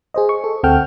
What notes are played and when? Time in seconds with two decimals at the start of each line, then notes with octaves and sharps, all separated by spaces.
0.14 G#4 C5 D#5
0.29 C#6
0.44 A4
0.63 D2 C4 A4 F#5 G5 F6